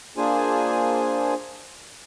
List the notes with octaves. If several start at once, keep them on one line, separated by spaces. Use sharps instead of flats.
A#3 D4 F4 G#4 C5 G#5